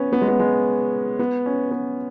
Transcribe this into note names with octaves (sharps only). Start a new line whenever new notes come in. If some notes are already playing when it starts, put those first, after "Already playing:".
Already playing: B3 C#4
B3
G#3
B3
G#3
B3
C#4
B3